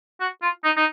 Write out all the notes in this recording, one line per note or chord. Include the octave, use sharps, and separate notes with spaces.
F#4
F4
D#4
D#4